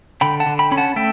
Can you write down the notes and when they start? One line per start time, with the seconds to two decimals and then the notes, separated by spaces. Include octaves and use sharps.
0.21 D3 G5 B5
0.40 F#5 A5
0.46 D3
0.59 G5 B5
0.71 C#4 B5
0.77 F#5 A5
0.96 A3 E5 G5